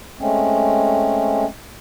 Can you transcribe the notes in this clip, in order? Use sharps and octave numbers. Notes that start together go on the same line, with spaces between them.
G#3 A3 C4 C#4